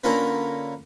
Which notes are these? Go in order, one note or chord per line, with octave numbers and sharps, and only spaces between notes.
D3 A#3 C#4 F4 A#4 B4